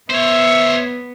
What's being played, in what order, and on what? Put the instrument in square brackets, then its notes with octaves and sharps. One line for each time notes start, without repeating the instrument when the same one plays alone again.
[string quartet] B3 [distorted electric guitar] C5 C#5 [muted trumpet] E5